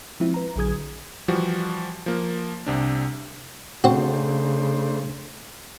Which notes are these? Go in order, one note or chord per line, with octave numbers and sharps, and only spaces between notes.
F3 G#3 C4 E4
B4 A#5
A#1 D3 F#3 G#4 D#6 G#6
E3 F3 G3 F#4
F3 A#3
C2 C3 D4
C#3 A3 C4 D4 F#4 C5